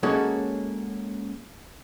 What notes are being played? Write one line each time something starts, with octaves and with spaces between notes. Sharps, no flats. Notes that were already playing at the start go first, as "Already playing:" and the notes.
G#3 A#3 C#4 F#4 A4 C#5